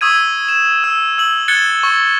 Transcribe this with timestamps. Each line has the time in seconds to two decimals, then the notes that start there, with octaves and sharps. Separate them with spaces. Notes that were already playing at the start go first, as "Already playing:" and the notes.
0.01 C#6 D#6 E6 G#6 D#7
0.49 E7
0.84 E6
1.18 E6 F#7
1.48 F#6 G#6 A6 C#7 G7
1.83 C#6